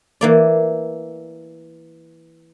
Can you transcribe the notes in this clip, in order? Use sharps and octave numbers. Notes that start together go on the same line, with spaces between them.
E3 A#3 D5